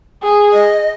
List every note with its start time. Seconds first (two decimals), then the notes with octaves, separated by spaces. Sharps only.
0.23 G#4
0.53 D#5